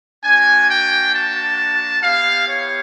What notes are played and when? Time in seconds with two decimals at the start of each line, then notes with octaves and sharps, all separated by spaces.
0.24 A#3 D4 F#4 G#5
0.69 G5
1.13 A5
2.03 B3 E4 G4 F5
2.47 C#5